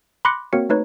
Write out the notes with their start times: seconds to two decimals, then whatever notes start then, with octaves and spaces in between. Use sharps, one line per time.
0.25 B5 C6 D6 F#6 A#6 C#7
0.53 A#3 C4 F#4 A#4 C#5 C#7
0.69 A3 D#4 B4 C#5